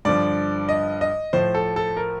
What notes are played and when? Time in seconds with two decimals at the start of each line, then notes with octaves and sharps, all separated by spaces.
0.05 G2 D3 F3 D5
0.69 D#5
1.01 D#5
1.33 A2 F3 C5
1.55 A4
1.76 A4
1.97 A#4